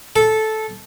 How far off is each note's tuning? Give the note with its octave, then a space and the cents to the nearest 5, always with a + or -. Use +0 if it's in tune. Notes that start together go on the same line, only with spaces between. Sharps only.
A4 -10